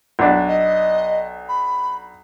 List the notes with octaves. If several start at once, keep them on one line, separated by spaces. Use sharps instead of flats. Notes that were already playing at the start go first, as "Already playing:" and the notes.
B1 D4
D#5
B5